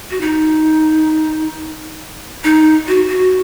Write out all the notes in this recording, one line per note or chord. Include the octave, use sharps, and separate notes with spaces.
F#4
D#4
D#4
F#4
F#4